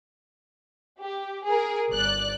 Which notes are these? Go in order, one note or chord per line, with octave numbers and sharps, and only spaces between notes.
G4
G#4 A#4
G1 D5 F#6